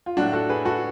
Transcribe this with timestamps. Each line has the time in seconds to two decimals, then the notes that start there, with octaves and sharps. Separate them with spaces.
0.06 F4
0.17 A2 F#3 D4 F#4
0.33 F#4 A4
0.49 G#4 B4
0.65 F#4 A4